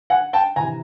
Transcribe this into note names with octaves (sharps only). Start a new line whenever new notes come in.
F#5 G#5
G5 A5
C3 E3 G#5 A#5